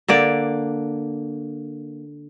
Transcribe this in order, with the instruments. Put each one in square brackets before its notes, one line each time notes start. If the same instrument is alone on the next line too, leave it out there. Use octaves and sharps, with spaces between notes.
[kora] D3 A#3 D5